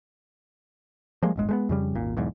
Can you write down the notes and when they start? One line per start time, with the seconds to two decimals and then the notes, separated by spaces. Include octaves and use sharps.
1.22 F3 G3 G#3 A#3
1.36 D1 G1 G#3
1.49 G#3 A3 B3
1.69 F2 C#3 G3
1.95 D#1 G#1 A#2
2.17 B1 E2 G#2